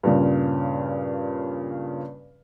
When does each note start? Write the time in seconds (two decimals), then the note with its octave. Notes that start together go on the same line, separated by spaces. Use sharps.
0.03 G2 A#2 C#3